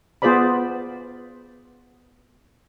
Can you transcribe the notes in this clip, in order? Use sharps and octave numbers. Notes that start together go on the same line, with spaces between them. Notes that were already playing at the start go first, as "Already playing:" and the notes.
B3 F4 G#4 C5 D5 B5